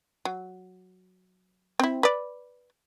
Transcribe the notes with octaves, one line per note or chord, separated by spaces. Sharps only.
F#3
C4 E4
B4 D5